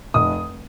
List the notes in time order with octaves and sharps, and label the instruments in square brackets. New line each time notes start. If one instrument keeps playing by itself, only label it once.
[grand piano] F1 D#6